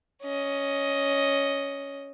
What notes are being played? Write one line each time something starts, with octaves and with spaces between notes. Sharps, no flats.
C#4 D#5